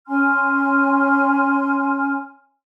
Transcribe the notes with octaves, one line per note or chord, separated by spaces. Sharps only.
C#4 G#5 C6 F6